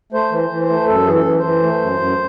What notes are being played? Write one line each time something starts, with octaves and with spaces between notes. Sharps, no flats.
A3 C5
E3
C5
E3
C5
A3
F#2 A4
E3 G#4
A4
E3
C5
E3
A3
F#2
F#2